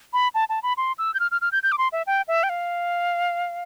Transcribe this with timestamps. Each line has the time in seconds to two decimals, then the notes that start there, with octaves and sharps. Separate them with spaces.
0.13 B5
0.35 A5
0.49 A5
0.63 B5
0.77 C6
0.98 E6
1.14 G6
1.20 F6
1.31 F6
1.41 F6
1.52 G6
1.63 G6
1.72 D6
1.78 C6
1.92 E5
2.07 G5
2.28 E5
2.43 G5
2.49 F5